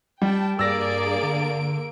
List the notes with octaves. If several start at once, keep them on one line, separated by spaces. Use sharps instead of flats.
G3 G5 A5
G2 A#3 G#4 D5 E6 A#6 D7
D3